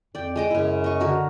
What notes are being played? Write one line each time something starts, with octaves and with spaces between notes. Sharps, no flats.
F2 D5 G5
G#3 D#5 D6
F#2 C#3 E4
D#5 C#6
D3 F#4 A#4